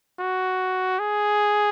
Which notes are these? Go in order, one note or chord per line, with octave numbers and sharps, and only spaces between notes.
F#4
G#4